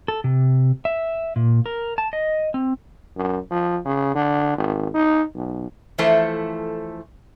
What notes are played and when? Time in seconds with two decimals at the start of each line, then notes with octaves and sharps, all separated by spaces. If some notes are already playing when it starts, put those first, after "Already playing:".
0.08 A4
0.24 C3
0.85 E5
1.36 A#2
1.66 A#4
1.98 A5
2.13 D#5
2.54 C4
3.17 F#2
3.51 F3
3.85 C#3
4.15 D3
4.57 G#1
4.94 D#4
5.35 B1
5.98 E3 F3 A3 E4 A4 C5